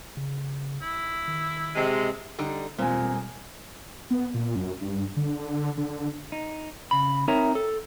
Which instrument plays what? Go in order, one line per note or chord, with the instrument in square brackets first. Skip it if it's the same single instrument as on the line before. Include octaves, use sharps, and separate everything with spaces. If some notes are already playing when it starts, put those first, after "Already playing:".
[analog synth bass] C#3
[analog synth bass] G1 [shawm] E4
[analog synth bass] D#3
[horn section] C3 G#3
[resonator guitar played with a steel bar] D3 G3 D#4
[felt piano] E1 C4 F4 [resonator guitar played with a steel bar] A#2 [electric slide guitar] G3 G#5
[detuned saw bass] B3
A#2
F#2
G2
D3
D3
[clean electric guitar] D#4
C#3 B5
C4 D#4 A#4 C#5 E5 A#5
A4